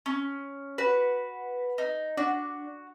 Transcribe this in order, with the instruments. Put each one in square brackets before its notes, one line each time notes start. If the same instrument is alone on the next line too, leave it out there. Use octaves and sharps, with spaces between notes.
[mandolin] C#4
[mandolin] F#4 [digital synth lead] B4
[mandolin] D#4
[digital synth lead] D4 [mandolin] F#4